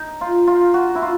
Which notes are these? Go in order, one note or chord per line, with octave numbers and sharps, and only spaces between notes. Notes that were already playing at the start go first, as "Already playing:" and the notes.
Already playing: D#4
F4
F4
F#4
E4
F4